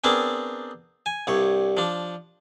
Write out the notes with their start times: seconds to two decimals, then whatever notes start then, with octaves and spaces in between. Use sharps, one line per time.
0.04 B3 C4 D4 G#4 A#4 A5
1.06 G#5
1.27 C2 G2 C#5
1.77 F3 D4